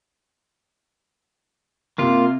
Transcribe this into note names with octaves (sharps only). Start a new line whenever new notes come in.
C3 A#3 F4